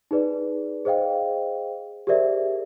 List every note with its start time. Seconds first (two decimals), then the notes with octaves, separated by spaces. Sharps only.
0.11 D#4 G#4 B4 D5
0.85 G#4 C5 D#5 F5 G5
2.07 G4 G#4 A#4 C5 D5 E5